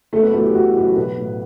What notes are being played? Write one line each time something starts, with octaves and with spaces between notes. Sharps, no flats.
F#1 A3 A4
B3 B4
F#2 E3 A3 A4
G4
F#1 F#4
F#2 E3 G4
B1 B3 B4
A2 E3